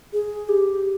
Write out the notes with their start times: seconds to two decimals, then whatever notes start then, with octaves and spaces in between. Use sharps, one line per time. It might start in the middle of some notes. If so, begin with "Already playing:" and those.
0.13 G#4
0.49 G4